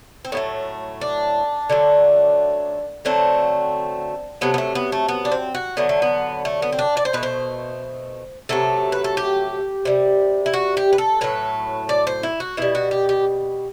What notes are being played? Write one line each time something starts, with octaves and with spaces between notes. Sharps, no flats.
C4
A2 F#3 A3 B3
D4
D3 F#3 A3
D3 F#3 A3 C4
C3 F#3 A3 B3
B3
A3
B3
A3
B3
D4
C4
F#4
D3 F#3 A3 B3
A3
B3
A3
B3
C4
D4
D5
C5
B2 A3 B4
C5
C3 F#3 A3 A4
B4
A4
G4
C3 G3
E4
F#4
G4
B4
A4
A2 F#3 A3 B4
D5
C5
E4
F#4
B2 G3 E4
F#4
G4
G4